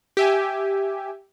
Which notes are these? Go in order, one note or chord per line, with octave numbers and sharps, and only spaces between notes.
G4 E5 G#5